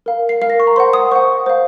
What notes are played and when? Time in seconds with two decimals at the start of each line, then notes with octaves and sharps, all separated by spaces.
0.06 A#4 F5
0.29 C7
0.42 A#4 F5 C7
0.50 A#6
0.60 C#6
0.67 A#5
0.76 C5 F#5 C6
0.93 D#6
1.12 C5 F#5 C#6
1.46 C5 F5